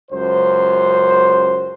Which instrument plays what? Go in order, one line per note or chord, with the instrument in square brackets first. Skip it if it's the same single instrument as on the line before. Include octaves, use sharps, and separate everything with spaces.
[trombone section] C#2 F#2 C5